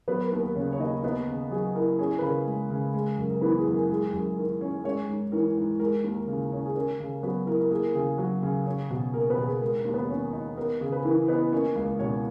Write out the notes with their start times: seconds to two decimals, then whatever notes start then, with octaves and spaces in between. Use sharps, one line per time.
0.08 F#3 B3 B4
0.21 A#4
0.32 D#2 A#4
0.44 A#4
0.55 C#3 C#4 C#5
0.72 C#5
0.79 D#2 D#4 D#5
1.03 B3 D#4 D#5
1.27 C#3
1.51 F#3 G#4
1.75 E4 A#4
1.99 C#4 G#4
2.19 B4
2.22 C#3 A#4
2.47 G#3
2.70 C#3
2.94 G#3
3.18 F#2
3.30 A#4
3.41 E3 B3 B4
3.58 G#4
3.66 F#2
3.74 A#4
3.90 G#3 G#4
4.13 F#2 G#4
4.37 D#3 A#4
4.61 C#4
4.84 G#3 C#4 C#5
5.09 G#2
5.32 E3 A#4
5.57 G#2
5.80 G#3 A#4
6.04 D#2
6.28 C#3
6.52 C#4
6.66 G#4
6.75 C#4 A#4
7.00 C#3
7.23 F#3 B3 B4
7.46 E4 A#4
7.60 A#4
7.71 A#3 G#4
7.95 C#3 G#4
8.18 F#3
8.43 C#3
8.66 C#4
8.91 B2
9.14 A#3 A#4
9.30 B3 B4
9.38 B2
9.46 G#4
9.61 G#3 A#4
9.77 A#4
9.85 D#2
9.94 B3 B4
10.09 D#3 C#4 C#5
10.33 D#4
10.57 B3 A#4
10.81 C#3 G#4
10.92 B4
11.05 E3 A#4
11.28 B3 D#4 B4
11.52 A#3 C#4 C#5
11.76 C#2
11.99 B2 C#4 C#5